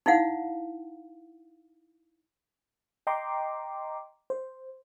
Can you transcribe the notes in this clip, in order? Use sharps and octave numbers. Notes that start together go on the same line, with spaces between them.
D#4 E4 F5 F#5
D#5 G5 A#5 C6 D6
C5